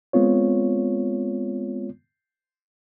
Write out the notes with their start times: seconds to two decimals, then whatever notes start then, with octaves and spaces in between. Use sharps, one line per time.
0.13 G#3 B3 C4 F4 C#5